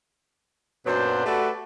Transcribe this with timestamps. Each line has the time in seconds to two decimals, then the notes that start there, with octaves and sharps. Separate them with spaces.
0.86 F#2 A#2 F#3 B3 D4 C5
1.26 A3 F#4 G4 A4 B4 D5